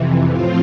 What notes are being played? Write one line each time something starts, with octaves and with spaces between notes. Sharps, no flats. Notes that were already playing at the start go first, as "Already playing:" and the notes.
Already playing: F2 C3 E3
A2 F3 C4 F4